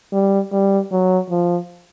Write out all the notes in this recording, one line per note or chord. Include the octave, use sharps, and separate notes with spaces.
G3
G3
F#3
F3